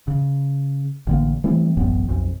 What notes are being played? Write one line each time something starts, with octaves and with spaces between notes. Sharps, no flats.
C#3
A1 D3 A#3
E3 G3 A3 C4
E1 A1 F#2 B3
B1 F2